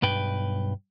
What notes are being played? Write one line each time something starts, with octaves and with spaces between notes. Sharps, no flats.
B1 G2 B4 G5